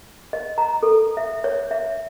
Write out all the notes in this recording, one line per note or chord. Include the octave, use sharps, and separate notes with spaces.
D#5
A#5
A4
E5
C#5
E5